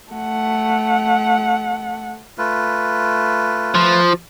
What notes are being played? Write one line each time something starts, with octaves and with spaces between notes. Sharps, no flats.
A3 F#5
A3 F4 B4
F3